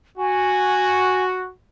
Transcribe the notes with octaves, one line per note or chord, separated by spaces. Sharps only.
F#4 G#5